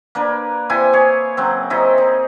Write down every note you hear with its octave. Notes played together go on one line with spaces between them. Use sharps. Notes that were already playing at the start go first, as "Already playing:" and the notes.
A#3 D4 B4
C3 E4 G5 G#5
G#4 C#5
C#3 F#3 C4
C3 D#4 E4 D#5
D#4